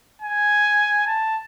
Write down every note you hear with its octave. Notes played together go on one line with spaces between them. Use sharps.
G#5
A5